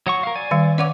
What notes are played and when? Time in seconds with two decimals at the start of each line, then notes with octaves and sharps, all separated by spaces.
0.07 F#3 F#5 C#6
0.23 A#4 F5
0.36 D5 G#5
0.51 D#3 G3
0.78 C#4 B4 C#5 D5 F#5 D6